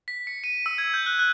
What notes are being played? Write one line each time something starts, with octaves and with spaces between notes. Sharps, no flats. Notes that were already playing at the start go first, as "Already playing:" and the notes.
B6
C#7
D#7
E6
G#6
G6
F#6
F#6